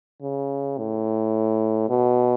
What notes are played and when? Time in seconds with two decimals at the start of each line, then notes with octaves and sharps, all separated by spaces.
0.22 C#3
0.78 A2
1.89 B2